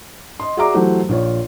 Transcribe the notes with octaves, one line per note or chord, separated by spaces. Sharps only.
D#5 C6
F#4 G#4 D5 E5 A#5 D6
E3 F#3 A3 F#4 G4 C5
A#1 F4 C#5